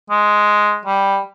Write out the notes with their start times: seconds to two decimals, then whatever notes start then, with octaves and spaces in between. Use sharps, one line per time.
0.10 G#3
0.85 G3